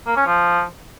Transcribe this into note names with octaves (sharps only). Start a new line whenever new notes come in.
A#3
C#4
F3